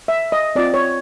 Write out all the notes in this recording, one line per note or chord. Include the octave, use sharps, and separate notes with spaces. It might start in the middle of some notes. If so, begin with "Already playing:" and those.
E5
D#5
C4 F4 D5
C#5